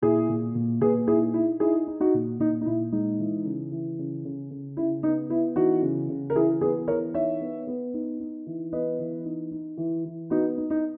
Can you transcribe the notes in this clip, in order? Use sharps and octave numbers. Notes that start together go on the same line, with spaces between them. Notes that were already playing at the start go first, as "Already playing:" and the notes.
A#2 E4 G#4
A#2
A#2
A#2 G#4 B4
D#4 E4 G#4
D#4 E4
D#4 E4 G#4
D#4
D#4 F#4
A#2
A#2 D#4
D#4
A#2 E4
G#3 D#4
E3
C#3
E3
C#3
C#3
C#3
C#3 E4
B3 D#4
B3 E4
E3 D#4 F#4
C#3
C#3
A#4
E3 E4 G#4
B3 G#4 B4
E3 A#4 C#5
D#4 C#5 E5
B3
B3
D#4
D#4
E3
B3 B4 D#5
E3
D#4
D#4
E3
E3
B3 D#4 F#4
D#4
D#4